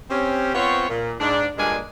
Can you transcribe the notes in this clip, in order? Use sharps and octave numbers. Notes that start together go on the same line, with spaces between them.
C4 C#4 G4
B3 C4 F4 C5 C#5
A#2
G#2 D4
G2 A#2 G#3 A#3 D4 G#5